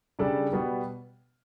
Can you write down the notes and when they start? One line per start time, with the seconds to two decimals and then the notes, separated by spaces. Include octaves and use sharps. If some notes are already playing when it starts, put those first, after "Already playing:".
0.19 C#3 G3 D4 A4 D5
0.53 B2 G3 B3